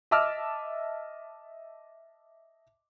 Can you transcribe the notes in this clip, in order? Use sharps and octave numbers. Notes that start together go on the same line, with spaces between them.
D#5 E5 A5 D6 E6 F6